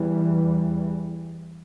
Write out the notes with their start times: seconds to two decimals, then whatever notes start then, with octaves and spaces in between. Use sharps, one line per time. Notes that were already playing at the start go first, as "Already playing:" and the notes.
Already playing: E2 E3 G3